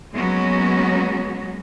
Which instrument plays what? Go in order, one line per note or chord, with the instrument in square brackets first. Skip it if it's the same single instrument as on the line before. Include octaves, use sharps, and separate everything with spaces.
[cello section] F#3 G#3 A#3 B3 C#4 F#4